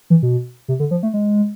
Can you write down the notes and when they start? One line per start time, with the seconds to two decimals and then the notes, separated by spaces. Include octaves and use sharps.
0.10 E3
0.23 B2
0.68 C3
0.80 D3
0.91 F3
1.03 A3
1.14 G#3